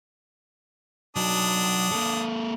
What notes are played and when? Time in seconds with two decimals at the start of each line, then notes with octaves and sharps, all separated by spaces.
1.16 F#3 D4 D#4 D#6
1.92 A#3 A4